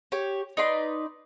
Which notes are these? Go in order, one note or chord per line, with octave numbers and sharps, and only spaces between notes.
G4 C#5
D#4 B4 D5 C6